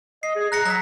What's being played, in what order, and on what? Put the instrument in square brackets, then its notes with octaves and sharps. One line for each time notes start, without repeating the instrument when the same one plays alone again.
[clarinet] D#5 [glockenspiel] C7
[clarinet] G#4
[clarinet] A#5 [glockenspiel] F#6 A#6 C#7
[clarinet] F#3 [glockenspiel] A#5 B6